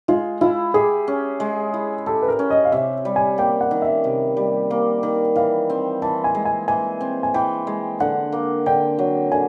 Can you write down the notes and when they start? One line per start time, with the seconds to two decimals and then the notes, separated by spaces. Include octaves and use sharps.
0.08 G#3 F4
0.41 E4 F4
0.74 G4 G#4
1.08 C#4
1.40 G#3
1.74 E4
2.06 G4 A4
2.22 B4
2.28 A#4
2.39 C#4
2.50 D#5
2.65 F5
2.72 C3 E5
3.05 G3
3.16 G#5
3.38 A#3 G5
3.61 F#5
3.71 D#3
3.82 E5
4.04 C3
4.37 G3
4.71 A#3
5.03 D#3
5.36 E3 F5
5.70 C4
6.02 E3 A5
6.24 G#5
6.35 G#3
6.45 G#5
6.68 E3 G#5
7.01 C4
7.23 G#5
7.34 E3 G5
7.67 G#3
8.00 D3 F#5
8.32 A#3
8.66 D3 G5
8.99 F#3
9.32 D3 G#5